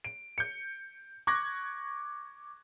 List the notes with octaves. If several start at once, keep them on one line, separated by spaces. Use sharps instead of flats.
D7
G6 C#7
C#6 D6 F#6 G#6 A#6